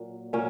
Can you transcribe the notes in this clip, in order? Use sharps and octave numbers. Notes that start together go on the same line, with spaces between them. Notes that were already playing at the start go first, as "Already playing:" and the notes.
Already playing: A#2 F#3
A#2 F#3 C#4